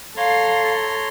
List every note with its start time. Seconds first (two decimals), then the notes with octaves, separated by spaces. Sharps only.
0.17 A4 C#5 F5 A#5 C6